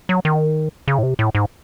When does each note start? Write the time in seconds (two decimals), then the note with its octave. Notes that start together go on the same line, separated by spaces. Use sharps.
0.09 F#3
0.25 D#3
0.88 C#3
0.98 A2
1.03 C3
1.19 A2
1.35 G#2